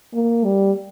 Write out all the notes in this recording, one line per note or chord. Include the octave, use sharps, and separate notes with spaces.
A#3
G3